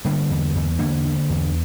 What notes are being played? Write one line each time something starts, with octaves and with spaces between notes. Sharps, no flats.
D3 G3 A#3
E2
E2
D3 A#3 D4
D3
E2